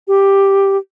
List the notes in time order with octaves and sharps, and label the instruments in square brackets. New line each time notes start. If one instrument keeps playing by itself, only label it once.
[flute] G4